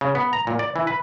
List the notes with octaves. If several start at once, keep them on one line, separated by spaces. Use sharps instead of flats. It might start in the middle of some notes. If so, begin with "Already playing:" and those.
C#3
B3
A#5
A#2
D5
E3
B4